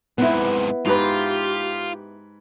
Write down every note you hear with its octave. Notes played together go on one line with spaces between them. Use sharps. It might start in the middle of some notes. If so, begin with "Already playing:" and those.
G#2 C3 B3 E4
G#2 F4 G4 B4